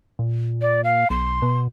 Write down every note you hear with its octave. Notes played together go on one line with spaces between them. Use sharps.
A#2
D5
F5
B1 C6
B2